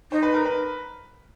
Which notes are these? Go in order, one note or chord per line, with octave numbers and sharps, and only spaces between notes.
D#4 C5
B4
A#4
B4